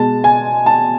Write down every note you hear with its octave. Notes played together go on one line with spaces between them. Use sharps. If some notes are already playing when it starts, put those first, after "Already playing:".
Already playing: B2 G#3 A5
G#5
A5